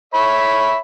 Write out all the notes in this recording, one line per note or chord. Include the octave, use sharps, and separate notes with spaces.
C#5 E5 B5